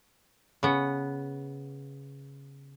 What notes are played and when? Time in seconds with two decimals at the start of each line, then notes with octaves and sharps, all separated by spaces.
0.63 C#3 B3